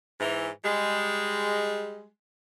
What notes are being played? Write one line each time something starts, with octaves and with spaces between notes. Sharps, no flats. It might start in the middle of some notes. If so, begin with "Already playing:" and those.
G#2 E3
G3 G#3